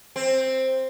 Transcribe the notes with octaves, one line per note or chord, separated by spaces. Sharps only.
C4